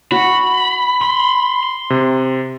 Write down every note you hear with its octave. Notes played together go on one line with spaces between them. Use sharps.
F#4 B5
C6
C3